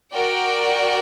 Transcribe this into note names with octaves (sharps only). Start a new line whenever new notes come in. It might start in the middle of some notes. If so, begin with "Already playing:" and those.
F#4 A#4 D5 G5